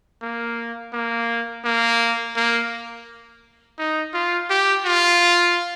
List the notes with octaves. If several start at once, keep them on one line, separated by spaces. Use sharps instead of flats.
A#3
A#3
A#3
A#3
D#4
F4
G4
F4